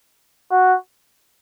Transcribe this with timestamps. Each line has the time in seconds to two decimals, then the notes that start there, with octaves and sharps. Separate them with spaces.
0.51 F#4